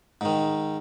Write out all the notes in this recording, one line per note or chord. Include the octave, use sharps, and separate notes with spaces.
G#2 D#3